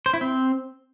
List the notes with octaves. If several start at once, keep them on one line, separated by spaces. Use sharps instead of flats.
C5
E4
C4